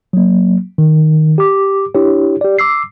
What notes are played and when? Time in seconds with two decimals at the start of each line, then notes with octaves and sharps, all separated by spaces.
0.13 F#3 A#3
0.78 D#3
1.38 G4 D6
1.95 D4 E4 G4 C#5
2.41 G4 D5
2.59 D6 E6 C7